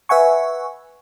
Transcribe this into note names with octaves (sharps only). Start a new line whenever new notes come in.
B4 E5 F#5 G#5 C#6